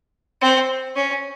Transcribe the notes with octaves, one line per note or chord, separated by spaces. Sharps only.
C4
C#4